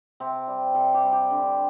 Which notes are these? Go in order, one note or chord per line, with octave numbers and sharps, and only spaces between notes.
C3 C4
G3
C3 A4
G4
G3
G4
D3